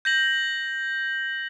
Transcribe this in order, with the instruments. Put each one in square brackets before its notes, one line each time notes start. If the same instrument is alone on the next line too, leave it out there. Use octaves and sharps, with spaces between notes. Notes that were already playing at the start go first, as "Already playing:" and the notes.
[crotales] G6 A#6 F#7